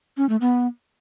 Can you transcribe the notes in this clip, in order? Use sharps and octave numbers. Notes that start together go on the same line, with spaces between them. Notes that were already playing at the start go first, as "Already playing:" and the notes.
C#4
A3
B3